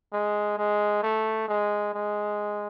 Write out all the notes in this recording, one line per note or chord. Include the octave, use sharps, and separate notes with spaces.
G#3
G#3
A3
G#3
G#3